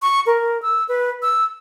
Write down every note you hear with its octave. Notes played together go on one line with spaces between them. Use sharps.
C#6
A#4
E6
B4
E6